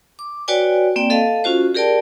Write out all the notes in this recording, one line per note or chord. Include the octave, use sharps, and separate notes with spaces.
D6
F#4 B4 C#5 D5 G5 G#5
A#3 C4 D5 G5
A4 D#5 F5 A5
C#4 F4 F#4 C5
G4 G#4 A#4 D5 G5 A5